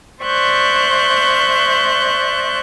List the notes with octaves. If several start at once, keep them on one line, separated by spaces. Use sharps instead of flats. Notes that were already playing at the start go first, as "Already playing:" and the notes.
C5 D5 E5 C#6 F#6 G6